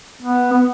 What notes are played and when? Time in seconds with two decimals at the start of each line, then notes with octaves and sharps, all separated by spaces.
0.23 B3
0.52 B3